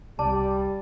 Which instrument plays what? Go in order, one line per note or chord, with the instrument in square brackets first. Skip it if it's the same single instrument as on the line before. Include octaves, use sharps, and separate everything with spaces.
[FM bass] C2 [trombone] G3 [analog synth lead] D5 [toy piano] A5